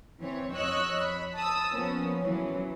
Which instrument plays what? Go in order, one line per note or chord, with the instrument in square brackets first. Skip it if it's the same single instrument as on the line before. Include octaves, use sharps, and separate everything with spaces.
[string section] E3 C4 C#5
F2 C#5 D#5 C#6 E6 F#6
B5
A5 D#6 E6
F3 A#3 B3 C#4
E3 F#3 C#4